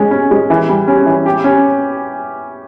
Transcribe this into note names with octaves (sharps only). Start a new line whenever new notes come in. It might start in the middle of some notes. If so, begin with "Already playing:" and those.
Already playing: G#3 C#4
C#4
G#3
E3
G3
C#4
E3
G4
C#4